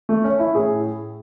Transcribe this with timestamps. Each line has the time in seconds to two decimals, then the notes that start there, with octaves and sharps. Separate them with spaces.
0.09 A3
0.24 C#4
0.39 E4
0.55 A2 G#4